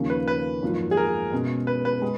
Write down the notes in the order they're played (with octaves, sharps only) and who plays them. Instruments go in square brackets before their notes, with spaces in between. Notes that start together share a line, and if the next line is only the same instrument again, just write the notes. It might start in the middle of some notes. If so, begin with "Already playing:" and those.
Already playing: [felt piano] D#2 C#3 F3 A#3 C#4
[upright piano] B4
B4
[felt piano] G#1 F#2 F3 A#3 F4
[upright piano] G#4
A#4
[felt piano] B2 G#3 C#4
[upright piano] B4
B4
[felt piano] G#3